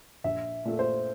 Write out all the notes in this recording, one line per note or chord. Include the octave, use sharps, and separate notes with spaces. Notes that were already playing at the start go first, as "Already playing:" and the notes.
A#1 E5
A#2 A3
C5